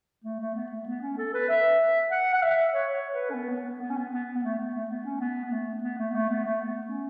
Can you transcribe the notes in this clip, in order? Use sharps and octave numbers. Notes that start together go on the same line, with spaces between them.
A3
A3
B3
A3
B3
C#4
A4
B4
E5
F#5
F#5
E5
C#5
C#5
B4
C#4
B3
B3
B3
B3
C#4
B3
B3
B3
A3
B3
A3
B3
C#4
B3
B3
A3
B3
A3
B3
A3
B3
A3
B3
C#4